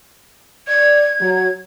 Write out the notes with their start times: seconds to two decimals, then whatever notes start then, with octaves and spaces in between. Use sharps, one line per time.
0.68 D5 G#6
1.21 F#3